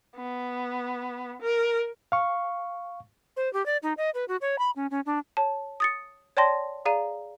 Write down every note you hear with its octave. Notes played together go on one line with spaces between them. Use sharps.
B3
A#4
F5 C#6
C5
G4
D5
D#4
D#5
B4
F#4
C#5
B5
C#4
C#4
D4
C#5 A5
D#6 A6 C#7
C#5 D5 G5 A5 C6 A#6
G#4 D5 F5 A#5 D#7